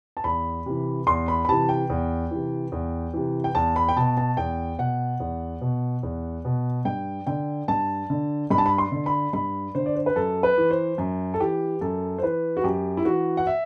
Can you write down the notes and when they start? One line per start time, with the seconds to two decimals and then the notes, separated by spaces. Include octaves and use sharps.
0.17 A5
0.24 E2 B5
0.66 C3 E3
1.07 E2 C6
1.28 B5
1.45 B5
1.49 C3 E3 A5
1.69 G5
1.90 E2
2.31 C3 E3
2.72 E2
3.14 C3 E3
3.44 G5
3.55 E2 A5
3.76 B5
3.89 G5
3.96 B2 A5
4.17 A5
4.37 E2 G5
4.79 B2 F#5
5.20 E2
5.61 B2
6.03 E2
6.45 B2
6.85 G2 G5
7.27 D3 G5
7.68 G2 A5
8.10 D3
8.50 G2 B5
8.58 A5
8.66 B5
8.78 C6
8.92 D3
9.06 B5
9.33 G2 B5
9.75 D3 C5
9.86 D5
9.96 C5
10.06 B4
10.16 F#2 A4
10.43 B4
10.58 E3
10.71 C5
10.98 F#2
11.34 A4
11.40 E3 G4
11.81 F#2 A4
12.18 C5
12.23 E3 B4
12.57 F#4
12.64 F#2 G4
12.97 E4
13.05 E3 F#4
13.37 F#5
13.47 E5